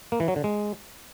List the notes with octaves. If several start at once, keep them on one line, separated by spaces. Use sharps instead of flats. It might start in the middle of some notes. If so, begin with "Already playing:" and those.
A#3
E3
F#3
D3
G#3